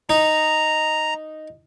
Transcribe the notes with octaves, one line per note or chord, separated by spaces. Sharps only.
D#4 A#5